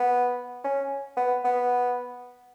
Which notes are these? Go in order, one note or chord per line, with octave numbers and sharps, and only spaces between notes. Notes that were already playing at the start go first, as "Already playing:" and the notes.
Already playing: B3
C#4
B3
B3